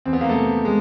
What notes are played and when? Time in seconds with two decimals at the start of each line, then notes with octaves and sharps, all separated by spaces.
0.05 E2 C4
0.13 B3
0.21 A#3
0.29 A3 B3
0.35 C3
0.65 G#3